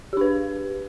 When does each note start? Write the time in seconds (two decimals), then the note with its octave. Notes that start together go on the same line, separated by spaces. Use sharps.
0.13 G4
0.17 D4
0.21 B4